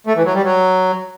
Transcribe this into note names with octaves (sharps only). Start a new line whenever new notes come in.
A3
E3
F#3
G3
F#3